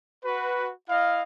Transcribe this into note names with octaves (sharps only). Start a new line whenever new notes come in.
F#4 B4
E4 D#5 F5